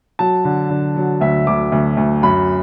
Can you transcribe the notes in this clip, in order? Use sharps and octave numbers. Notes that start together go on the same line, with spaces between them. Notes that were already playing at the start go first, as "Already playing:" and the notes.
F#3 A5
D3
D3
F#3
D2 E5
D2 D6
D2
D2
F#2 B5